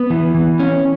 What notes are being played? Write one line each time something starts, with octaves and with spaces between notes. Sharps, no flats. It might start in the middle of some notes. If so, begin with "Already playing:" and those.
Already playing: B3
E3
E3
C#4